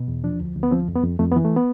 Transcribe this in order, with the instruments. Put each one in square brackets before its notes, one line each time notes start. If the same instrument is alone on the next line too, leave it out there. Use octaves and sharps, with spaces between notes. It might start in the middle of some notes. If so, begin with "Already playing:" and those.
Already playing: [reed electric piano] B2
E2
F3 D4
D2
D2
B3
F3 C4
F2
B3
F2
F2 A3
B3
E3
A3
B3